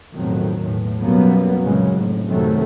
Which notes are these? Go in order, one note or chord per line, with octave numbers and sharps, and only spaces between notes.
B1 F2 A2 D#3 F#3
E2 A2
F#2 B2 F#3 G3 A#3 B3
C2 F#2 A#2 C#3 F#3 G#3
F1 A2
F#2 C3 D#3 F#3 A3